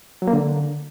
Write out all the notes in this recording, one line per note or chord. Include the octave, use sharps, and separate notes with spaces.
F#3
A#3
D3